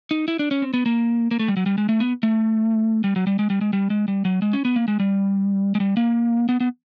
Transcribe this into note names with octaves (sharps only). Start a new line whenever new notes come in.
D#4
E4
D4
C#4
C4
B3
A#3
A#3
A3
G3
F#3
G3
G#3
A3
B3
A3
G3
F#3
G3
G#3
G3
G#3
G3
G#3
G3
F#3
G#3
C#4
B3
A#3
G#3
G3
G#3
G3
A#3
B3
B3